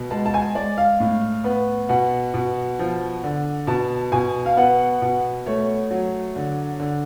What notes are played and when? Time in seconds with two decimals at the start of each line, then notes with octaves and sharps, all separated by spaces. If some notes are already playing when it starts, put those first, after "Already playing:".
Already playing: B2
0.11 G#3 A5
0.26 A5
0.34 G#5
0.55 G#3 D5
0.78 F5
1.00 A2
1.44 B3
1.89 B2 F#5
2.34 B2
2.79 F3
3.24 D3
3.67 B2 A5
4.12 B2 G#5
4.46 F5
4.57 B3 F#5
5.02 B2
5.46 A3 C#5
5.91 F#3
6.36 D3
6.80 D3